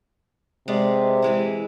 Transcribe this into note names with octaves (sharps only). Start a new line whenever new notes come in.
C3 G#3 B3 D5
E3 G#3 E4